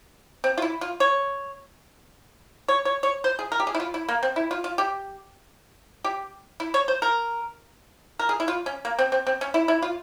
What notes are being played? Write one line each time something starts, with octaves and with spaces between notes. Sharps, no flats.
C4
F4
E4
F4
C#5
C#5
C#5
C#5
C5
G#4
A#4
G4
G#4
E4
F4
E4
A#3
C4
E4
F4
F4
G4
G4
E4
C#5
C5
A#4
A#4
G#4
E4
F4
C#4
A#3
C4
C4
C4
C#4
E4
E4
F4